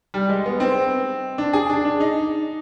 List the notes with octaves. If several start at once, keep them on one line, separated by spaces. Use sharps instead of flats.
G3
G#3
B3
C4
D4
G#4
D4
D4
D#4